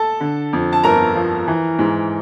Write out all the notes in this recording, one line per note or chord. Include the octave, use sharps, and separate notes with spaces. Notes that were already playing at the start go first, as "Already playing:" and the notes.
Already playing: A4 A5
D3
F2
A5
G1 A#4 A#5
F3
E3
G#2